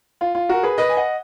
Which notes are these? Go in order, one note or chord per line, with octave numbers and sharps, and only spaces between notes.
F4
F4
F#4 A#4
G#4 B4
B4 D#5
G#5
D#5 F#5